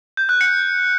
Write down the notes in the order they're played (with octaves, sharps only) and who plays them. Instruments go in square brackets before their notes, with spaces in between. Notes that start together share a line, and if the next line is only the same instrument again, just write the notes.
[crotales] G6
F#6
C#7